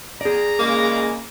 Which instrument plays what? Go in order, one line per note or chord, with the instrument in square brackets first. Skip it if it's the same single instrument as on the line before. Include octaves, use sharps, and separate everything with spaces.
[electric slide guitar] G#4 D5 [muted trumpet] A#5
[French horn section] A#2 C#3 G#3 [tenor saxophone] A#3